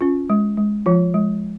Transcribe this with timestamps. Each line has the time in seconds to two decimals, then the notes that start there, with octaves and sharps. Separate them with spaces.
0.01 C#4 F4
0.30 G#3
0.57 G#3
0.86 F3 F4
1.14 G#3